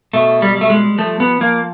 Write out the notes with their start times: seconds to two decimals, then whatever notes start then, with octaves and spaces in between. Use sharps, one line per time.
0.13 B2 A3
0.42 G3
0.55 G3
0.61 A3
0.70 G#3
0.98 F3 A3
1.20 B3
1.41 F3 A#3